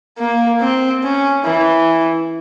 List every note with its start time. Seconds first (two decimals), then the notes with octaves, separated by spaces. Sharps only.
0.19 A#3
0.60 C4
1.03 C#4
1.44 E3